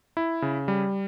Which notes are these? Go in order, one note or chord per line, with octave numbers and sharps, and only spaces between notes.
E4
C#3
G3